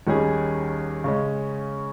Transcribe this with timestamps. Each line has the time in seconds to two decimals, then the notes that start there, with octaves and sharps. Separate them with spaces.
0.07 D#2 D#3 G3 C#4 G#4
1.04 C#3 G#3 C#4